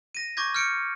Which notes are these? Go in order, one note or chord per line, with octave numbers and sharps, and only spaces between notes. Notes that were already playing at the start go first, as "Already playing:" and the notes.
A#6 D#7
C#6 D6 G6 G#6 A#6
F6 G6 C#7 D7